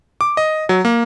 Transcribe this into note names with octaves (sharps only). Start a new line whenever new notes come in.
D6
D#5
F#3
A#3